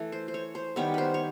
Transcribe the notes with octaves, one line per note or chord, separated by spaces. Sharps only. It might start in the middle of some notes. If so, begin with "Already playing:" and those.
Already playing: E3 A3
C5
C5
C#5
C5
D#3 G3 B3 C#5
B4 C5
C#5